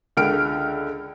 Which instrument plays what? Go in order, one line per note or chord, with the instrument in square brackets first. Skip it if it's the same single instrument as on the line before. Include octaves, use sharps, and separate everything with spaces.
[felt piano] C#2 D3 F6 D7